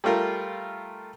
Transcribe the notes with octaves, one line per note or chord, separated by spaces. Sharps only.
G3 A3 F4 A#4